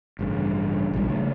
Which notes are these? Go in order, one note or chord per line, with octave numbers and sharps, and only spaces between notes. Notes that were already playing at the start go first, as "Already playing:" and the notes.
A1 G2 C#3
A#1 G#2 D#3 G3
C#3 A3